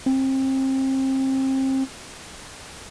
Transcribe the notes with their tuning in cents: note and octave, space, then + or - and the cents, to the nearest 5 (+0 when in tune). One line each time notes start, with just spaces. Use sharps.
C4 +30